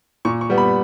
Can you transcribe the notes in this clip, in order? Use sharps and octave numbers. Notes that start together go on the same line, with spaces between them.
A#2 C#6
C#6
G3 B3
B5